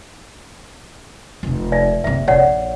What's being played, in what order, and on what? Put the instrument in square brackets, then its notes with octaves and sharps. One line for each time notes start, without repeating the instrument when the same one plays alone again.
[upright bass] F1 C3
[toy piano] D#4 D5 E5
[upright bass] F#1 C3 [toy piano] E5
[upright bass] A#1 [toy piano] C#5 D5 F#5